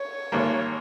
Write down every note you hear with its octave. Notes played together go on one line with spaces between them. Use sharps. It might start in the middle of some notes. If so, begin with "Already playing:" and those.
Already playing: C#5
G#1 G#2 G3 A#3